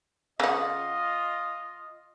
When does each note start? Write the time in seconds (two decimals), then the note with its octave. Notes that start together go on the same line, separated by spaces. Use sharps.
0.40 C#3 F4 D#5 F#5